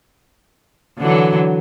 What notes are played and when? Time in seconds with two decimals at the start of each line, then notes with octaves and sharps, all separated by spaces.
0.99 D3 E3 F#3